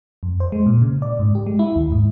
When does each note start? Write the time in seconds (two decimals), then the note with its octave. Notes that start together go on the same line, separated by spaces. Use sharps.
0.23 F2
0.40 C5
0.52 G#3
0.66 A#2
0.82 C#3
1.02 D5
1.19 G#2
1.35 G4
1.46 G#3
1.59 E4
1.76 D#2
1.92 G#2